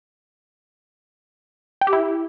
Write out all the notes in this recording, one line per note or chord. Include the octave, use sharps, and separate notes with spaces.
G5
G4
E4